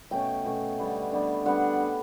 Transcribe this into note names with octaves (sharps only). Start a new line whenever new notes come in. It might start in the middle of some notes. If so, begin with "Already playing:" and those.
B2 A3 C#4 G5
B2 A3 C#4
D3 G3 B3 D4
D3 G3 B3 D4
D3 G3 B3 D4 F#5